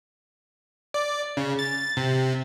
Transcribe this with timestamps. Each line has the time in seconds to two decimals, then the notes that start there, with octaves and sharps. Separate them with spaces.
0.94 D5
1.37 C#3
1.59 A6
1.97 C3